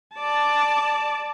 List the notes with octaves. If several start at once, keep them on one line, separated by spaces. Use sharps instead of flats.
D5 A5